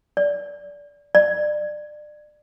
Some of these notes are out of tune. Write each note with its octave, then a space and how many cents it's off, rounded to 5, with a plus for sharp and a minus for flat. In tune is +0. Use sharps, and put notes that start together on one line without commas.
D5 -20
D5 +30